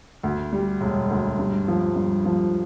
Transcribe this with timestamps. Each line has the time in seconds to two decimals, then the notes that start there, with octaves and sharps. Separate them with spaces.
0.23 D2
0.53 G3
0.81 E1
1.10 D2
1.39 G2
1.68 F3
1.96 G2
2.25 F3